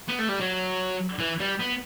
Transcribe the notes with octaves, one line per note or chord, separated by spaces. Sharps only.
B3
A3
G3
F#3
E3
G3
B3